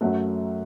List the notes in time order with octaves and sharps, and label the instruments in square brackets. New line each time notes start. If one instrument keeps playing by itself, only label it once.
[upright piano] F#2 F#3 A3 F#5